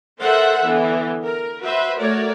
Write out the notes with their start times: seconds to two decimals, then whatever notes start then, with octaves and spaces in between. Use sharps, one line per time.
0.21 A4 A#4 C5 E5 F#5
0.66 D3 E3 B3
1.21 A#4
1.61 F#4 B4 C5 E5
1.98 A3 F#4 A#4 C#5 D5